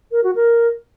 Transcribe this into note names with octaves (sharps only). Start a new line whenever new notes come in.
A#4
F#4
A#4